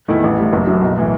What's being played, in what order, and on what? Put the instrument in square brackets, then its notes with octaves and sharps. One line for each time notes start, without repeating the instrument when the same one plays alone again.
[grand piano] E2 D#3 A3 E4
A1
A2 G3
F#1
F#2 F#3
B1
A2 E3